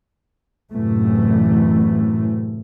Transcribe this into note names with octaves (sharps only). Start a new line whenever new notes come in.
F#2 A2 C3 E3 A3